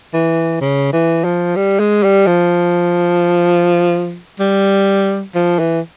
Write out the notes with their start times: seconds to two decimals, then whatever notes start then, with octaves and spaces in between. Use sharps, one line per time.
0.13 E3
0.61 C#3
0.93 E3
1.24 F3
1.56 G3
1.79 G#3
2.03 G3
2.27 F3
4.40 G3
5.35 F3
5.59 E3